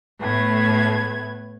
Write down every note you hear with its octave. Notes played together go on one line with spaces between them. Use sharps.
A2 A3 B3 G#6